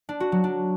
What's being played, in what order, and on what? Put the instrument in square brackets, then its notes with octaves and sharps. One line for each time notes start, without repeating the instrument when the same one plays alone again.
[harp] D4
F#4
F#3
D4